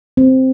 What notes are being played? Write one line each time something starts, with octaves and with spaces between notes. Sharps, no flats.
C4